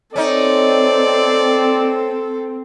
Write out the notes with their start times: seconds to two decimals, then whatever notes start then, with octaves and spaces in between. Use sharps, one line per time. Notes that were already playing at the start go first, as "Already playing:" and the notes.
0.16 C4 C#4 D#4 A4 D5